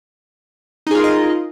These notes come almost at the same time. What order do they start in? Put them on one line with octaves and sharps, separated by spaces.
D#4 G#4 F4 A#4 D#5